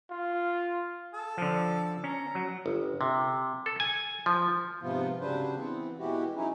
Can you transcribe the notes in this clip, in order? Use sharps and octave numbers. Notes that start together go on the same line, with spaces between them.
F4
A4
D3 F3
C#4 A#5
F#3
G1
C3
A4
G#5
F3
G#2 C3 F3 B3 F4
C#3 F#3 G3 D4 B4 C5
E3 B3 C4
B2 E3 G#3 E4 F#4 G4
F#3 C#4 D#4 E4